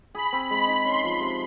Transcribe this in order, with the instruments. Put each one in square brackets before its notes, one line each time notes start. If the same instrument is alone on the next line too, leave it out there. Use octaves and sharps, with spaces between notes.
[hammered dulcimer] G#4 [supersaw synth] B5
[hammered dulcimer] C4
[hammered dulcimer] G#3 [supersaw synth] B5
[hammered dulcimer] D#4
[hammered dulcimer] C#4 [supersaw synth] C6
[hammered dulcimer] F3
C3